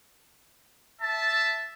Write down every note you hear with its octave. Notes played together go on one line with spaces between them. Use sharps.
E5 A5